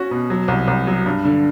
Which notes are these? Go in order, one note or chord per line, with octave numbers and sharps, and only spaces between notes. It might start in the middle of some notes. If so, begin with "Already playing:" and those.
Already playing: C#4 F#4
B2
F#3
C2
C2
F#3
G2
D3